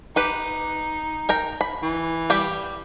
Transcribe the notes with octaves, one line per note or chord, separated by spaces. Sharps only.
D#4 G4 B4
A#4 G5 A#5
B5
E3
G3 G4 B5